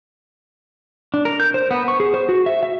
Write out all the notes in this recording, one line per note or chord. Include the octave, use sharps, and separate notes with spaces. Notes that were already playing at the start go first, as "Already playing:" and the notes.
D4
A#4
G6
C5
B3
C#6
G#4
C5
F#4
E5
E5